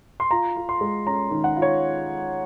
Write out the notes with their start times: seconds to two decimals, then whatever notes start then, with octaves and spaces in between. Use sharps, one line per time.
0.20 C6
0.31 F4 A#5
0.56 F4
0.69 C6
0.81 G#3
1.07 C#4 A#5
1.31 D#3
1.44 F#5
1.57 F4
1.62 C#5